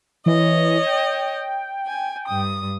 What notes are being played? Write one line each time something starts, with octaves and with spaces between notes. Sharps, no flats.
E3 C#5 D#5
G5
G#5
G2 D#6